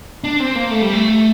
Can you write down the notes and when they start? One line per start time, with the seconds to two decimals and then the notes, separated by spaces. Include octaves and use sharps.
0.24 D4
0.40 C4
0.55 A#3
0.71 A3
0.82 G3
0.93 A3